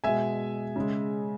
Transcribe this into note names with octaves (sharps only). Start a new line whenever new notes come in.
B2 G#3 E5 G#5
C#3 G#3